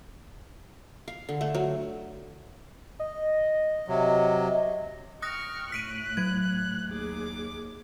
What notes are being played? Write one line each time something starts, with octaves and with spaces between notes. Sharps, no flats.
F5
D3
A3
F#3
D#5
C3 F#3
G5 C#6 D#6 F6 F#6 A#6
A2 F#6 B6 D7 D#7
F#3 G#6
D#2 G#4 D6